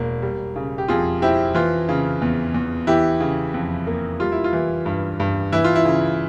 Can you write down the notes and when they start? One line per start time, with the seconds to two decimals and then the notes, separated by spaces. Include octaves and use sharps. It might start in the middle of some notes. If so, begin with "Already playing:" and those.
Already playing: E1 A#3
0.22 G3
0.56 C#3
0.78 G4
0.88 F2 F4 G#4
1.22 C4 E4 G4
1.55 E3 F4
1.89 C#3
2.22 E2
2.54 E2
2.87 E3 E4 G4
3.20 C#3
3.54 F2
3.87 A#3
4.20 G3 F4
4.32 E4
4.44 F4
4.53 E3
4.86 G2
5.20 G2
5.52 E3 E4
5.64 F4
5.75 E4
5.85 C#3